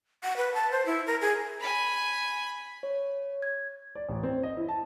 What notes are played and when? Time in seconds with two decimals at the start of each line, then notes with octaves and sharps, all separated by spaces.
0.24 F#5
0.37 B4
0.54 A5
0.71 C5
0.86 E4
1.07 A#4
1.21 G#4
1.60 G#5 B5
2.83 C#5
3.42 G#6
3.95 D5
4.09 A1
4.23 C4
4.43 D#5
4.57 E4
4.69 A5